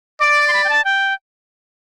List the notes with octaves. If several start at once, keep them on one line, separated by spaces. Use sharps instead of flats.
D5 D6
C6
B5
G5
A5
G5